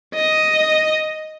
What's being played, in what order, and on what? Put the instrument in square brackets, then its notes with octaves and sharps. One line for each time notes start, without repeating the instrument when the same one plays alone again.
[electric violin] D#5